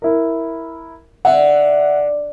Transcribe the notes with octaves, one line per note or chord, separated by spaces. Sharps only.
E4 A#4
D3 E5 F#5